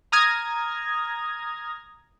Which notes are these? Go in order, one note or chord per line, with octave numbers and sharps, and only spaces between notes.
A#5 D#6 F6 G#6 A#6